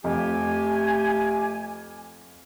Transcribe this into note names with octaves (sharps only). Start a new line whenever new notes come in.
F2 A3 G4 G#5